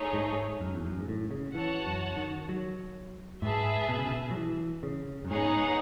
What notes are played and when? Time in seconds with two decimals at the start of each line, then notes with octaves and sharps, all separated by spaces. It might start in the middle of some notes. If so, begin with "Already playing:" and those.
Already playing: A3 D#4 G#4 C#5
0.13 G#2
0.61 F#2
0.75 E2
0.85 F#2
0.99 G#2
1.08 A2
1.31 C#3
1.54 E3 F#4 C#5 F#5 A5
1.86 F#2
2.17 D#3
2.49 F#3
3.42 G#2 G#4 B4 E5 A5
3.89 B2
3.98 C#3
4.07 B2
4.31 F#3
4.36 E3
4.83 C#3
5.25 F#2
5.30 G#2 B3 D#4 G#4 C#5 F#5